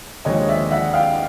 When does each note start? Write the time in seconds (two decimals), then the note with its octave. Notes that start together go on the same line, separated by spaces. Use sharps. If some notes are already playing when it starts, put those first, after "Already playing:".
0.25 D#2 D3 F3 G#3 C#5 D#5
0.48 D5 E5
0.71 E5 F#5
0.94 F5 G5